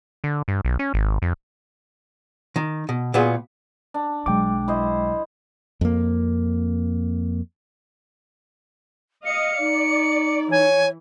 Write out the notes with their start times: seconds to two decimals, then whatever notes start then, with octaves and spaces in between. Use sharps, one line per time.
0.24 D3
0.48 G2
0.65 B1
0.79 C#4
0.94 G#1
1.22 F2
2.56 D#3
2.89 B2
3.14 A#2 G#3 B3 F4 F#4 G#4
3.94 D4
4.26 B1 F#3 G#3 G5 D6
4.68 E4 C5 D#5
5.81 F2 A#3
9.25 D#5 F5 C#7
9.60 D#4 D5
10.51 E3 C#5 G#5